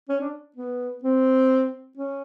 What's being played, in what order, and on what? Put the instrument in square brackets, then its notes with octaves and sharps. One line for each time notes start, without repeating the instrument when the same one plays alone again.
[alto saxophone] C#4
D4
B3
C4
C#4